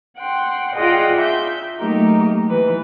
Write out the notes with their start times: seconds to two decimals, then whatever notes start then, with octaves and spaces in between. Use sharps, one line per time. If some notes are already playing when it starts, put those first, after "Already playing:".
0.18 F#5 G5 C6
0.75 F4 G#4 D5 D#5 F#5 G5
1.18 E5 G6
1.78 F#3 A3 A#3 D#4 G4 A#4
2.50 E3 B4